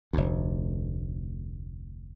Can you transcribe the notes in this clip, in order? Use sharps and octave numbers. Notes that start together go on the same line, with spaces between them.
F1 D2